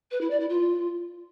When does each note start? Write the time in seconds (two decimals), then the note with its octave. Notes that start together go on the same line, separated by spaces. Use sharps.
0.11 B4
0.21 E4
0.30 D5
0.40 E4
0.50 F4